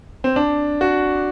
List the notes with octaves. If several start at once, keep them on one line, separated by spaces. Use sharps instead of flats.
C4
D4
F#4